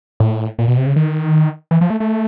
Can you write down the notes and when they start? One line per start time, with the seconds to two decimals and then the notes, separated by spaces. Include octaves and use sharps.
0.20 A2
0.59 A#2
0.68 B2
0.77 C3
0.86 C#3
0.96 D#3
1.71 E3
1.81 F3
1.90 A3
2.00 A3